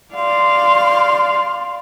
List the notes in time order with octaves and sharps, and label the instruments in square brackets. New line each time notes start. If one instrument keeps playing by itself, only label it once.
[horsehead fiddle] D5 F5 [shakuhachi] C6